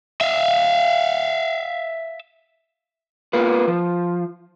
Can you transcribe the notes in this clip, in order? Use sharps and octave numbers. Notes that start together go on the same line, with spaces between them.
E5 F5
A#3 B3 F4 B4
F3